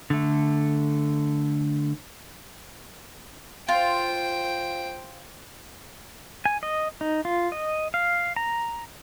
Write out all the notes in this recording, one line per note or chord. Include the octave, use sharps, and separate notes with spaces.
D3 A3
F4 C5 G5
G#5
D#5
D#4
F4
D#5
F5
A#5